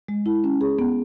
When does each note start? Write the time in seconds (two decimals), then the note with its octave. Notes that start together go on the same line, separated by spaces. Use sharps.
0.09 G#3
0.26 E4
0.44 C#4
0.61 G#4
0.79 B3